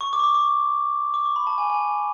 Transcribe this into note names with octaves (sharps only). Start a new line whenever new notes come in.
C#6
D6
C#6
D6
C#6
D6
C#6
B5
A5
G#5
G#5